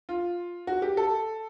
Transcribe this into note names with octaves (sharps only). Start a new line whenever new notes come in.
F4
F#4
G4
A4